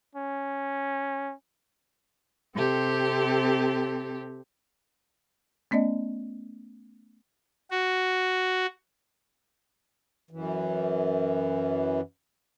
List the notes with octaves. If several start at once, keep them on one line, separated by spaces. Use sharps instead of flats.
C#4
C3 C4 G4 A4
A3 B3 C#4 D5 D#5
F#4
F#2 E3